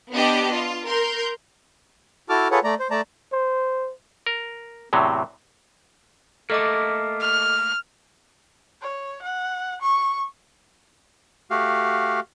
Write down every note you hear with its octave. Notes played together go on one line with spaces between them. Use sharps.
B3 D4 G4 D#5
F4
A#4 C6 G6
E4 F#4 A4 A5 D6 F6
F4 G#4 A4 B4 C#5 F#5
A3 D5 A#5
C5
A3 D5 A5 A#5
C5
A#4
E2 A2 C3 F#3
A3 A#3 A4 D#5 D6
F6
C#5
F#5
C#6
A3 F#4 G4 F5